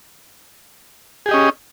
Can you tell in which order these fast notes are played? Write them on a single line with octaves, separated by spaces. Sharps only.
G#4 G4 D#5 C#4